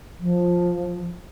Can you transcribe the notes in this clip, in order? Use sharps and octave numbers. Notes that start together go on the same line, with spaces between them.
F3